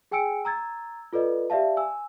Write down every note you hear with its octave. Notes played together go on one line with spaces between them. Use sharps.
G#4 G5 G#5 E6 C#7 D7
A#5 E6 G#6 A6
F4 A4 B4 D5 D#5
G4 D5 E5 F5 A5
G#5 E6